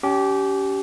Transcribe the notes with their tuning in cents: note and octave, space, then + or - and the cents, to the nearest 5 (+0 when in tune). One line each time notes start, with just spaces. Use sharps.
C#4 +35 G4 -15